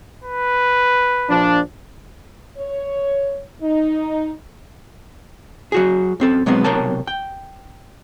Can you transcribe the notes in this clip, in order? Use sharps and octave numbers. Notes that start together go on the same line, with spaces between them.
B4
A#1 F3 D4
C#5
D#4
F#3 F#4 G#4
F#2 C4 A4
B2 F#3 G#3 B3 C4
B1 C3 A#4 C#5 G5 A5
G5